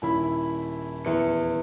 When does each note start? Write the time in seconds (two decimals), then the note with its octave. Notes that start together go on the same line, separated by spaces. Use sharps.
0.02 D#1 E4 B5
1.05 E2 C#7